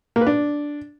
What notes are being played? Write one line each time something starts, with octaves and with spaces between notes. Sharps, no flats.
A#3
B4
D4